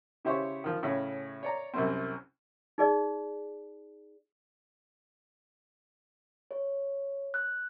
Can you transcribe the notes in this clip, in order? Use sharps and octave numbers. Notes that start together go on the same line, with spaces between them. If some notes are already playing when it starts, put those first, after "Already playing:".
C#3 E4 G4 C5 C#5 C#6
D#3 F3
A2 C#3 C#4
C#5 D5 A#5
C2 F#2 C4
D#4 G#4 D5
C#5
F#6